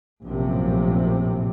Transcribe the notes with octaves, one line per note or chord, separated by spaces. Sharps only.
A#1 F#2 A2 C3